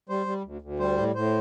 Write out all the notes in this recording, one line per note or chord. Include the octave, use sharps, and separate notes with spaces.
G3 C5
G3
D2
D2
G3 C5
A2
A2 C5